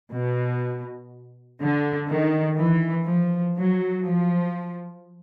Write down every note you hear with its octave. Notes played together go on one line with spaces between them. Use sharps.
B2
D3
D#3
E3
F3
F#3
F3